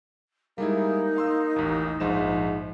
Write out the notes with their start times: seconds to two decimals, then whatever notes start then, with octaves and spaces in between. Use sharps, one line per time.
0.58 G3 G#3 A#3 D#4 E4
1.16 F5 C6 E6
1.56 A1 D#2
2.00 A#1 G#2 F3 E7